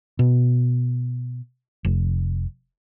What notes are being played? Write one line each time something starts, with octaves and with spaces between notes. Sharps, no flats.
B2
F1